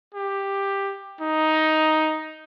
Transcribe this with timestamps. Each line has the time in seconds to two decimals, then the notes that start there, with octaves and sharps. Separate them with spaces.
0.14 G4
1.21 D#4